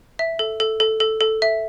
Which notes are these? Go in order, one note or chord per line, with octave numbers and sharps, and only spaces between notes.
E5
A4
A4
A4
A4
A4
E5